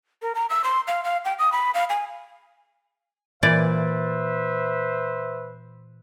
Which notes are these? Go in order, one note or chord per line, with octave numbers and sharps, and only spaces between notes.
A#4
A#5
E6
C6
F5
F5
G5
D#6
B5
F5
G#5
A#2 E3 B4 C5 D5 E5